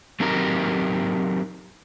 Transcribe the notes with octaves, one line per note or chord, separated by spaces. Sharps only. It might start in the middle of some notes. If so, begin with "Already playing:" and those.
F#3 C4 D#4 G4 A#4